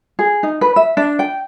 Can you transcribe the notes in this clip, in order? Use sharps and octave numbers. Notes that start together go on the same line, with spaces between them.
G#4
D#4
B4
E5
D4
G5